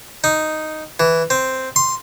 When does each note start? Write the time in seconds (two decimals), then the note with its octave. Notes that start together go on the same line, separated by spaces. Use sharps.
0.24 D#4
1.00 E3
1.30 C4
1.76 C6